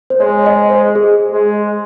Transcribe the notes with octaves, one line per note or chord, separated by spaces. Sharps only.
C5
G#3 C#5
D#5
C5
G#4
G#3